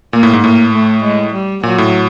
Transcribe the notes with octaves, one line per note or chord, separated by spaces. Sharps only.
A#2 A#3
A2
G#2
A2 A#3
A3
G#3
G3
A#2 F#3
A2